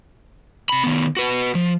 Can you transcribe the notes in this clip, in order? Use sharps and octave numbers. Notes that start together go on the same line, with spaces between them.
C3 B5
D#3 B3
F#4 B4
F3